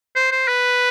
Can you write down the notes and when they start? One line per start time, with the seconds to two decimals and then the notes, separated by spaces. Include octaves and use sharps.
0.16 C5
0.32 C5
0.48 B4